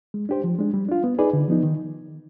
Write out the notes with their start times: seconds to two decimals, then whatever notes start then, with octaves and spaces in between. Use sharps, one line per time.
0.14 G#3
0.29 D4 G4 C5
0.44 F3
0.59 G#3 D4
0.74 G3
0.89 D4 F4
1.04 B3
1.19 D#4 G#4 B4 D5
1.33 D3
1.48 F3 B3 D#4
1.63 D#3